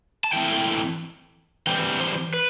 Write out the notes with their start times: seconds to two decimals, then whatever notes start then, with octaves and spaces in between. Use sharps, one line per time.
0.24 A5
0.33 E3 A3 C4 E4 G5
1.67 E3 G3 C4 G5
2.00 C5
2.34 B4